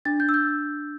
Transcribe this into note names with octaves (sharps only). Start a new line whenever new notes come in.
D4 A6
D4 G6
E6
G6